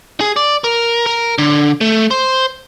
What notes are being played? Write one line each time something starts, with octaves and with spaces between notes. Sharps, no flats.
G#4
D5
A#4
A#4
D3
A3
C5